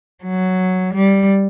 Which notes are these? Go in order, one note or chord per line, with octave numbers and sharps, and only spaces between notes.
F#3
G3